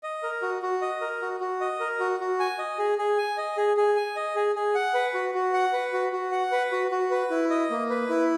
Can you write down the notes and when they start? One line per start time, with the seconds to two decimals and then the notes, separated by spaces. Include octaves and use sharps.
0.03 D#5
0.23 A#4
0.42 F#4
0.62 F#4
0.82 D#5
1.01 A#4
1.22 F#4
1.40 F#4
1.61 D#5
1.80 A#4
2.00 F#4
2.20 F#4
2.40 G#5
2.59 D#5
2.79 G#4
2.98 G#4
3.18 G#5
3.37 D#5
3.57 G#4
3.77 G#4
3.96 G#5
4.16 D#5
4.35 G#4
4.55 G#4
4.75 F#5
4.94 B4
5.14 F#4
5.34 F#4
5.54 F#5
5.73 B4
5.93 F#4
6.13 F#4
6.32 F#5
6.52 B4
6.72 F#4
6.91 F#4
7.11 B4
7.30 E4
7.50 D#5
7.70 A#3
7.90 B4
8.09 E4